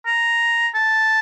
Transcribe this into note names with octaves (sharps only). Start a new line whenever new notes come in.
A#5
A5